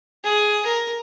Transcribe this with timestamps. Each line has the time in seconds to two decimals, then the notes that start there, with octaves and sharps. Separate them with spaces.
0.24 G#4
0.66 A#4